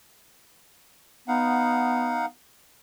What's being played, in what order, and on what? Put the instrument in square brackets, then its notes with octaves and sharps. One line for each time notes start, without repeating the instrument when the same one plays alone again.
[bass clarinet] B3 [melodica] D#4 F5 F#5